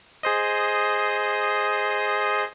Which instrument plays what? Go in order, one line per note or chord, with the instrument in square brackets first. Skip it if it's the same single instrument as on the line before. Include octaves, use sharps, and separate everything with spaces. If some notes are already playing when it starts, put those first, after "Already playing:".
[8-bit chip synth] G#4 C5 D#5